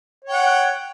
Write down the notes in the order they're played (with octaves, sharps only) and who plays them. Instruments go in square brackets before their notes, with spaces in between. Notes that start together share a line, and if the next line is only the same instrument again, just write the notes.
[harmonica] C#5
G5
F#5